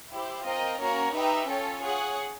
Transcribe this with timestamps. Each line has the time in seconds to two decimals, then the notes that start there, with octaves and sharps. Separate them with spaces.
0.11 E4 G4 C5
0.46 C4 F4 A#4 D#5 G5
0.80 A#3 C#4 F#4 A#4 C#5
1.14 D#4 G4 B4 E5 G5
1.48 C#4 F4 A4 C#5
1.83 G#4 C#5 F#5